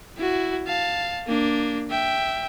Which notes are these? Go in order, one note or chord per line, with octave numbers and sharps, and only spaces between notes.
E4 F#4
F5 A5
A#3 D4
E5 G5